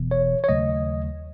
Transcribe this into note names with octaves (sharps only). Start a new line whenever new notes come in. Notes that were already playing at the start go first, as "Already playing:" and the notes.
Already playing: E1 E2 B2
C#5
C#5
D#2 C#3 F#3 A3 D#5